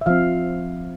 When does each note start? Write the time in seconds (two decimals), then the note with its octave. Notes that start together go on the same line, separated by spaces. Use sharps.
0.01 E5
0.06 F3 C4 F5